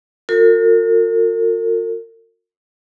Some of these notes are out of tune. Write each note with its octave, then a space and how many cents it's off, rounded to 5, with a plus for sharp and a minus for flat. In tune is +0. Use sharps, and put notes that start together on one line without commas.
F4 +45 A#4 -45